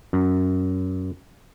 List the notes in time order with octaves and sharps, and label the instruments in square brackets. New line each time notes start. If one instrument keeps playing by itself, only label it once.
[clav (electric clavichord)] F#2